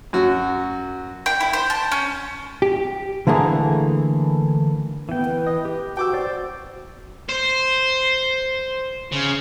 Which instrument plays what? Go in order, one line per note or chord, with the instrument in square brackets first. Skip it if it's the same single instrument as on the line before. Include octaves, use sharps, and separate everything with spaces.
[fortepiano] F#2 F#4
[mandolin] G5
E4
C5
A5
C#4
[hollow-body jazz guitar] G4
D3 E3 A3 A#3 G#4
[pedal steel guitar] E3 G5 [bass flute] B3
[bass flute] B4
[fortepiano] D#5
[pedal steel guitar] G4
[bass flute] F#4 [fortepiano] G5 D6 E6
[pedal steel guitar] C5 D5
[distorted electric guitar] C5
C#3